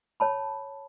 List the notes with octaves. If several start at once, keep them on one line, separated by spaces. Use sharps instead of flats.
C#5 A5 B5